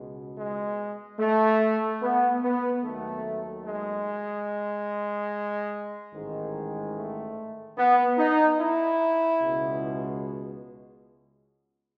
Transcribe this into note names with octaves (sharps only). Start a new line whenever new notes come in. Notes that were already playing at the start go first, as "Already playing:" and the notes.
Already playing: C#2 B2 G#3
G#3
A3
B3
B3
D#2 D#3 F#3 A3
G#3
A1 G#2 D#3 G#3
A3
B3
D#4
E4
C#2 B2 G#3